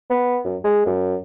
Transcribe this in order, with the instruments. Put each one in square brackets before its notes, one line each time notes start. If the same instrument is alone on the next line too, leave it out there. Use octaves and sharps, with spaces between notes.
[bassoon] B3
F#2
G#3
F#2